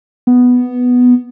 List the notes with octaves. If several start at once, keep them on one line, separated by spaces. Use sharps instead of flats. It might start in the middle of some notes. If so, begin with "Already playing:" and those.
B3